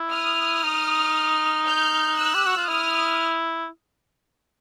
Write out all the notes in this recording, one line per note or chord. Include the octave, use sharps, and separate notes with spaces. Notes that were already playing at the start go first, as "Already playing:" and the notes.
Already playing: E4
D#6 F6
D#4
F6 G6
E6 F#6
G4
F#4
F4
E4 D#6 F6